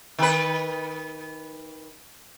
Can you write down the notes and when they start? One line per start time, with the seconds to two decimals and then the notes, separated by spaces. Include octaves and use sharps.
0.19 D#3 B4